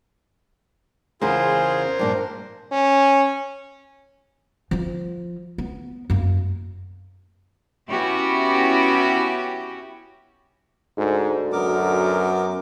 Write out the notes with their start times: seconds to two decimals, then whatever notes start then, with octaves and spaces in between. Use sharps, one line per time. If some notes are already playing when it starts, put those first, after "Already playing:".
1.22 E2 C#3 E4 F4 G#4 A#4 C5
1.99 G2 A#2 F3 D4
2.72 C#4
4.71 F3 F4
5.58 B3
6.10 F#2 A#3
7.89 B3 C#4 E4 F#4 G4
10.97 D2 G#2
11.53 F#2 B3 A#4 D6